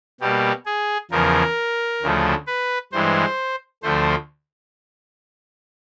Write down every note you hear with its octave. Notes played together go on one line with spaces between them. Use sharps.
B2 G3 A#3 G4
G#4
E2 C#3 F3 A#4
D2 C#3 F3 A3
B4
G2 E3 G#3 C5
D2 D3 F3 A3 C5